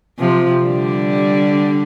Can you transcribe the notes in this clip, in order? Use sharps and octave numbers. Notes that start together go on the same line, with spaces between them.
C3 F3
D3 G3